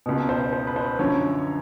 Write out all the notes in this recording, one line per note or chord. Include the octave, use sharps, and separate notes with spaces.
C#2 B2
C5
C5
B4
C5
F#2 D3 F3 C#5